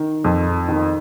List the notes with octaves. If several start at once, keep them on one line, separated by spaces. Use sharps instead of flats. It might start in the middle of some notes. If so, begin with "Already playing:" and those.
Already playing: D#3
F2
D#3